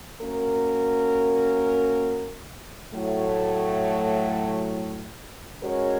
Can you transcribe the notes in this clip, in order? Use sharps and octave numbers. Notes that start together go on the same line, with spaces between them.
A#3 C#4 F#4 A#4
A2 F#3 A3
G#3 C#4 F#4 A#4 C#5